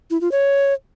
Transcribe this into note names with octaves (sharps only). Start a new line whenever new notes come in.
E4
F4
C#5